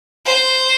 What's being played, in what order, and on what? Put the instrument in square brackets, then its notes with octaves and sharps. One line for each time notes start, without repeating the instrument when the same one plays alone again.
[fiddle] C5